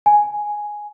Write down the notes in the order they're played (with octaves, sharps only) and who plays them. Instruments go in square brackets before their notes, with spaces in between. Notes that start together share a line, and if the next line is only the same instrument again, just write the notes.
[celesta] G#5